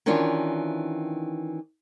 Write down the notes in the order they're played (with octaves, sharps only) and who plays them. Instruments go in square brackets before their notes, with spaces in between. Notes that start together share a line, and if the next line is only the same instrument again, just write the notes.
[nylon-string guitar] D#3 E3 C#4 D4 F4 F#4